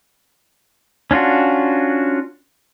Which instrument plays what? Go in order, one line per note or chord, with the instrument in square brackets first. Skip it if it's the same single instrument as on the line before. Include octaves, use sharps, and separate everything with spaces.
[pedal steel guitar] C#4 D4 F4 F#4